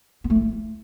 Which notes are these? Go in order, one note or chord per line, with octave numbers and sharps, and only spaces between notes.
B3
A3
E4